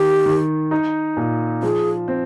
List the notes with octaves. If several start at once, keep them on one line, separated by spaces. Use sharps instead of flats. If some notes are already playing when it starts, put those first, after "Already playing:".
Already playing: D#3 G4
D#3
D#4
A#2
F3 G#4
C4